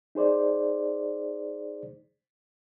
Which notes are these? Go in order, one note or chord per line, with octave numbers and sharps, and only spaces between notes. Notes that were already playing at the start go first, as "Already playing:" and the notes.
D#4 G#4 C5 D5